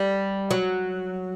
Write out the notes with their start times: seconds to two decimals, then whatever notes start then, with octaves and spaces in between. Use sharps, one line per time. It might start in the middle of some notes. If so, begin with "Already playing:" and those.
Already playing: G3
0.51 F#3